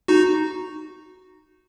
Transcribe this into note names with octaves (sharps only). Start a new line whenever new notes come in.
D#4 F#4